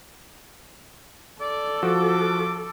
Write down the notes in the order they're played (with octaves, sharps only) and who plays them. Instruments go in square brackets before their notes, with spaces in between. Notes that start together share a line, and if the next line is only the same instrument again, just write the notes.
[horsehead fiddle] A4 [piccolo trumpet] D5
[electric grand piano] F3 F#4 [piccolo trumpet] D6